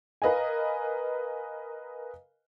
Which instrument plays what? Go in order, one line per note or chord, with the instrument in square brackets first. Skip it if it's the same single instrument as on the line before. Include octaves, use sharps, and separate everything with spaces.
[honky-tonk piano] A#4 B4 D#5 F5 G#5